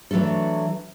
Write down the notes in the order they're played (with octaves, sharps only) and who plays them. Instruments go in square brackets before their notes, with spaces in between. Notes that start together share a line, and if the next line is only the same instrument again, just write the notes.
[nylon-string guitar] E3 F#3 A3 D4 A4